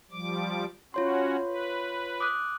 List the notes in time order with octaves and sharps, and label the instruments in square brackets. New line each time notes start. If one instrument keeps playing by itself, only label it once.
[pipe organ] F3 G3 D6
[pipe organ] C#4 F#4 [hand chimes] F4 C#5 C6
[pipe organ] B4
[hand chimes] D6 D#6 F#6